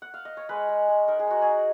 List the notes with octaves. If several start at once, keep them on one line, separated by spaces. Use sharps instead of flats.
F#5
F5
D#5
C#5
G#3 B4
G#3
G#3
D#4 A#4
G#4
D#4 F#4
G#4
D#4